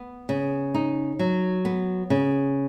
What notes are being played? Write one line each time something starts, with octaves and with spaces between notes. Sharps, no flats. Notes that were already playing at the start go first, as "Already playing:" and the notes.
Already playing: B3
C#3
D#4
F#3
B3
C#3